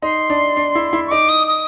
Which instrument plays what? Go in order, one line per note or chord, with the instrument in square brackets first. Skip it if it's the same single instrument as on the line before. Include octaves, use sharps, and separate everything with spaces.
[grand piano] D#4 [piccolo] C6
[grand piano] D4
D4
E4
E4
[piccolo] C#6
[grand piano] D#4 [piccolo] D6
[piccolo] D#6
D#6